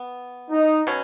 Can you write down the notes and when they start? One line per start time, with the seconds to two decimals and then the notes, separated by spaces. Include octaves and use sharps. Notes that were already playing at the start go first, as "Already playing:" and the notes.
Already playing: B3
0.51 D#4
0.87 B2 F#3 C#4